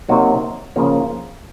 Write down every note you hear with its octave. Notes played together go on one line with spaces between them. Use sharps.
C3 F#3 A#3 D#4 F#4
C#3 F3 A#3 F4